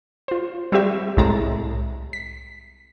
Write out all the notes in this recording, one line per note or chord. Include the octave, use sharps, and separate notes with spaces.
F4 C5
G3 C4 F#4 G4 E5
C2 A2 G#3 A5 A#5
B6